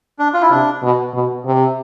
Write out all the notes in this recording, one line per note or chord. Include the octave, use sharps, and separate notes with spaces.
D4
F4
E4
C3 D4
B2
B2
C3